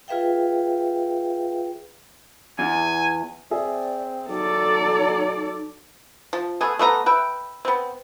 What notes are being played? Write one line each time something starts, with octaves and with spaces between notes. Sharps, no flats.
F4 G#4 B4 E5 F5 G5
E2 G#5
C4 G#4 D5 E5
F#3 D#4 A4 D5
F3
A3 B3 G#4
A3 B3 F4 A#5
B4 E5 G5
B3 C4